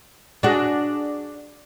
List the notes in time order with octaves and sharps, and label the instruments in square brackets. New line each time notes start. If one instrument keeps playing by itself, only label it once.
[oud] D4 F#4 G#4